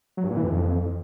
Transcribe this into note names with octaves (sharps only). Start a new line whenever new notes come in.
F#3
G2
A#2
E3
F2